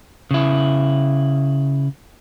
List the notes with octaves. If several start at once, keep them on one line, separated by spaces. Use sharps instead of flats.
C#3 E4